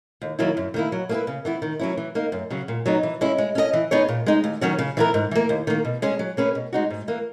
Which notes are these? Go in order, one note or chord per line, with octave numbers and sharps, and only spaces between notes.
D#2
D#3 F#3 A#3 E4
F#2
D#3 A#3 E4
F#3
A#3 E4 G#4 B4
C#3
E3 B3 E4
D#3
F#3 C#4 E4
E3
A#3 D#4
F#2
C#3 F#3
A#2
F#3 B3 D#4
E3
G#3 C#4 E4
G#3
C#4 G#4 D#5
E3
B3 D#4 G#4 C#5
A#2
G#3 D#4
D#2
D#3 F#3 C#4 F#4
C#3
E3 B3 E4 A#4
G#2
E3 A#3
D#2
D#3 A#3
B2
G#3 C#4 G#4
F#3
A#3 C#4 G#4 B4
B2
G#3 D#4 F#4
G#2
E3 A#3